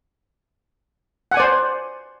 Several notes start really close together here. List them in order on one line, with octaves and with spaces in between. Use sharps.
F#5 G#5 D5 C5